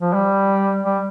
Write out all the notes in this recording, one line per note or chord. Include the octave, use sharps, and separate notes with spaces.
F3
G3
G3